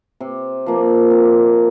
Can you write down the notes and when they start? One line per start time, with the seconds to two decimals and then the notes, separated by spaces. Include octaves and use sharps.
0.20 C3
0.66 F3 A#3
1.11 C3